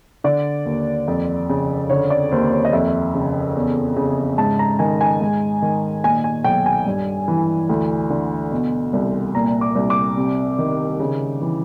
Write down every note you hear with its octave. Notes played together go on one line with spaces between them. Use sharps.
D3 D5
D#2
F2
C#3
D3 C#5
D5
D#2 C5
C#5
D#5
F2 E5
C#3
E2
C#3
G#2 A5
A#5
D#3 G#5
G#5
G#2
D#3
A#2 G#5
G#5
B1 G5
G#5
G2
E3
D2
D3
B2
C2
A#2 A#5
D6
C2
D6
C3
D#3
C#3
E3